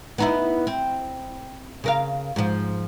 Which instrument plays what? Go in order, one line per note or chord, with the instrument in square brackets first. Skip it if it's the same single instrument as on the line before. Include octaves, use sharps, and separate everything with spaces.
[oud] B3 D#4 E4
C4
C#3 A#4 F5
G#2 F3